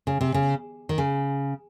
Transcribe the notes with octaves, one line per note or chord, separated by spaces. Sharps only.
C#3
C3
C#3
D#3
C#3